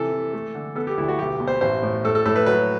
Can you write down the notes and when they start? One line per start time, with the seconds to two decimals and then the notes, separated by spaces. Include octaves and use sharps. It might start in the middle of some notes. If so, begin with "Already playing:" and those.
Already playing: C3 E3 A4
0.12 E3
0.33 A3
0.55 D3
0.75 B3 A4
0.87 G4
0.98 D2 E4
1.08 F#4
1.19 B1 G4
1.40 B2
1.47 C5
1.61 A1 C5
1.83 A2
2.04 A2 A4
2.15 A4
2.25 A2 A4
2.36 B4
2.46 F#3 B4